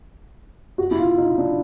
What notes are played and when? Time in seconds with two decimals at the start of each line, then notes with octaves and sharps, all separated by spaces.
0.78 F#4
0.91 E4
0.98 F4
1.18 D#4
1.38 D4